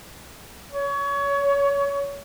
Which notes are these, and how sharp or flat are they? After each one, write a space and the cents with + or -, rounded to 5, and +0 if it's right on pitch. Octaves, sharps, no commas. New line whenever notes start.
C#5 +25